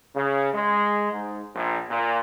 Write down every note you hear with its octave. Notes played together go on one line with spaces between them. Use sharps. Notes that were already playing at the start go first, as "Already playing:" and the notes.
C#3
G#3
G#2
A#1
A#2